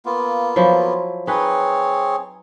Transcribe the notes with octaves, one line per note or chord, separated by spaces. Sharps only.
A#3 B3 F4
F3 F#3 E4
C4 D#4 G#4 B4 C#5